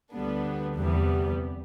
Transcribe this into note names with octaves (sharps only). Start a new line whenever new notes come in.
D2 D3 G3 B3 D4
E2 C3 E3 G3 B3